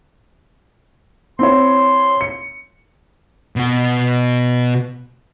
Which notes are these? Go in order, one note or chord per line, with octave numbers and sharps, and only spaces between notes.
C4 E4 C#5 C6
C#7
B2 F#4